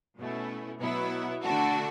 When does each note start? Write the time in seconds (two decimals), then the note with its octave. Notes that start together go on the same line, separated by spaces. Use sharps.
0.18 B2 A3 C#4 E4
0.81 B2 F#3 B3 E4
1.43 D3 A3 D4 F#4